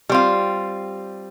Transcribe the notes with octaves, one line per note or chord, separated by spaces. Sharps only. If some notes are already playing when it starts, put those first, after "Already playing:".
G3 C4 F4